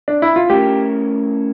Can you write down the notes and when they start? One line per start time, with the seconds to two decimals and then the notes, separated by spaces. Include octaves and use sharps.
0.08 D4
0.22 E4
0.36 F4
0.50 A3 C#4 E4 G4 A#4